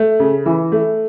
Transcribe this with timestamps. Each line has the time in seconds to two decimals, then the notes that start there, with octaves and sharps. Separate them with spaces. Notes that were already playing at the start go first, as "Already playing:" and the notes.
Already playing: A3
0.20 C#3
0.46 E3
0.72 A3